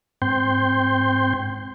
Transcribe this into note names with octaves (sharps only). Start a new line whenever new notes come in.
G#2 C4 G5 C6 G6